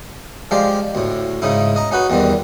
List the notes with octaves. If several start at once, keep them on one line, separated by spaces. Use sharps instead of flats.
F3 G#3 F4 G4 D5
D2 A2
G#2 C#3 D#4 E4
D#5 A#5
C#4 D#4 F#4 B4
E2 D#3 G3 C4